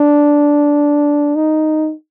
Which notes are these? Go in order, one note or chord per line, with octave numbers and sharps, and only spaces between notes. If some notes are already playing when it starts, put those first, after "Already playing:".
Already playing: D4
D#4